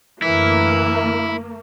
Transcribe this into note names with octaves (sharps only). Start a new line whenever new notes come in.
F#2 D3 E3 A3 A#3 E4